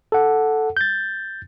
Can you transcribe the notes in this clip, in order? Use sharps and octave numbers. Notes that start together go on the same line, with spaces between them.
A4 F#5
G6 A6